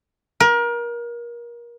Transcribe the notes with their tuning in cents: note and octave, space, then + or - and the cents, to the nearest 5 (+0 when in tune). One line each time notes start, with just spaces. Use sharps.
A#4 +30